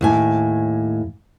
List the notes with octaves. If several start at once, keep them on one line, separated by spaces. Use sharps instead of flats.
D#2 A2 G#5